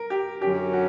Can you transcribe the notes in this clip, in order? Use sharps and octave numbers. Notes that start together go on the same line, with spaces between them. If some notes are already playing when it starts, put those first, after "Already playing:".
Already playing: A#4
G4
F#2 D3 F#3 C#4 G4
F#4